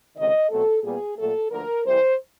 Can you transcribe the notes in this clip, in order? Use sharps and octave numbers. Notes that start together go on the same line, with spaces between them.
C#2 C3 D#3 D#5
B2 F#3 A3 C4 A4
A#2 G3 B3 G#4
A#2 F#3 A3 A4
D2 D3 F3 A#3 A#4
C2 C3 E3 C5